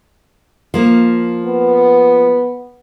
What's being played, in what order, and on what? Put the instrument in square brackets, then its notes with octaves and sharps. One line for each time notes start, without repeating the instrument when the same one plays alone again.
[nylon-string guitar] F3 A#3
[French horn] B3